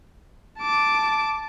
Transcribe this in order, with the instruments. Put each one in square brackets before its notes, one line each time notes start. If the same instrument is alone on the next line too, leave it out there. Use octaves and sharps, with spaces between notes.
[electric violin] A5 D6